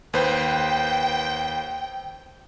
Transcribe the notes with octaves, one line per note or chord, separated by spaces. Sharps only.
D#2 B4 C5 G5